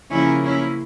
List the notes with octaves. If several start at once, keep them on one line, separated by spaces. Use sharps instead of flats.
C#3 F3 A#3 C#4 E4
C#4 E4